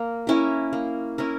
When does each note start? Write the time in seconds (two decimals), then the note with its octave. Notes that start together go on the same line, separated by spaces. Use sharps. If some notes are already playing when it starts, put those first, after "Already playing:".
Already playing: A#3
0.27 C#4 E4 A#4
0.73 A#3
1.18 C#4 E4 A#4